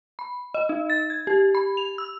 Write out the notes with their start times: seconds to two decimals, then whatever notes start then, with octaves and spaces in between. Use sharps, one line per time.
0.19 B5
0.54 D#5
0.69 D#4
0.90 A6
1.10 G#6
1.27 G4
1.55 B5
1.77 F7
1.98 E6